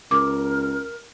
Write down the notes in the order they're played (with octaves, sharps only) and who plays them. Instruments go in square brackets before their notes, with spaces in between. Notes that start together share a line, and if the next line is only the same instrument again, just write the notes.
[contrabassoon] C#2 [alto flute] A#4 [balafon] D6